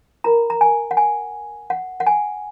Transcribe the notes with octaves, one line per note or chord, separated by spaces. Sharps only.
F4 A#4 A#5
A#5
G#5
F#5
G#5
F#5
F#5
G#5